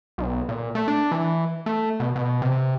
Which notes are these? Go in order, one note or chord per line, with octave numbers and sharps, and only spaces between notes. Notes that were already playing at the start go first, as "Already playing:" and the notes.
B1
A#2
A3
D4
E3
A3
B2
B2
C3